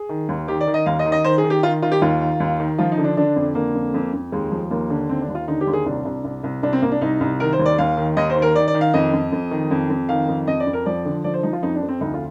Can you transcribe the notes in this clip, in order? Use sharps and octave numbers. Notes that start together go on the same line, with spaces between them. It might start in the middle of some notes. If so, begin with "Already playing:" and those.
Already playing: G#4
D#3
D#2
D#3 G4
D5
D#3
D#5
D#2 F5
D#5
D#3
D#5
D#3 C5
G#4
D#3
G4
D#3 F4
D#3 F4
G4
D#2 F4
D#3
D#2
D#3
F3 F4
D#4
D3
D4
D3 D4
F2
D3 A#3
F2
F2
F2
D#2 G#3
F3
D#2 A#3
D3
D#2 C4
D4
D#2
F4
D3 D#4
G4
D#2
G#4
C2 D4
C2
C2
C2
C2 D4
C4
C2 A#3
D4
C2 D#4
C2
D#3 A#4
C5
D#2
D5
D#2 F5
D#3
D#2 D#5
C5
D#3
A#4
D#3 D5
D5
D#3
F5
F2 D#5
F2
F2
D#3
F2
F2
D#3 F5
F2
F2 D#5
D5
F2
A#4
F3 D5
D3
F3 D5
C5
F3 D#4
F4
F2 D#4
D4
F2
C4
D2 D#4
F4